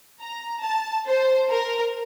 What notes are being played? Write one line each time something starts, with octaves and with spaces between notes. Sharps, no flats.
A#5
A5
C5
A#4